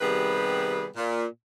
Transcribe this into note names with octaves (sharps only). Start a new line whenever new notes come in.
C3 D#3 G3 B3 G#4 B4
A#2